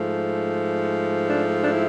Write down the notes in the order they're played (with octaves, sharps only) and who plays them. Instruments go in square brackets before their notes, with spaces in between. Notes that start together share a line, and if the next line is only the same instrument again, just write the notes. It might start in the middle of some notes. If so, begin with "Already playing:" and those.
Already playing: [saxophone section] G#2 F3 A3
D4
D4
E4